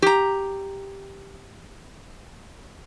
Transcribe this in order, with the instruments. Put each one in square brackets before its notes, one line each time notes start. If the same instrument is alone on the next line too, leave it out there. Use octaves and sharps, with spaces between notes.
[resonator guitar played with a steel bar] G4 A#5